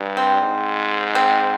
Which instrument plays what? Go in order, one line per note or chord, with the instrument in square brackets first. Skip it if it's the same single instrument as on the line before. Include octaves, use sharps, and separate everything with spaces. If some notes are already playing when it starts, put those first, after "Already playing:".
Already playing: [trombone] G2
[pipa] C4
[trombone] G#2
[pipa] C4